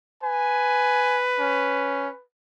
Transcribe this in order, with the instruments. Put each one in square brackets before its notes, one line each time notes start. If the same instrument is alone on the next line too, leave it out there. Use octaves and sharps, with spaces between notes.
[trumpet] B4 [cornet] G#5
[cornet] C#4